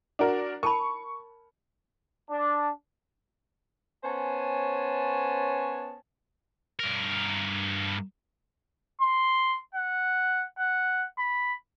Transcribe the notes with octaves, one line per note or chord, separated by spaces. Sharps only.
D4 F#4 A#4
A#4 A5 B5 C#6
D4
B3 C#4 C5 C#5 G#5 A5
G2 A#4
C6
F#5
F#5
B5